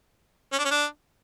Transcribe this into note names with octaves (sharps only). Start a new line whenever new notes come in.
C#4
D4
C#4
D4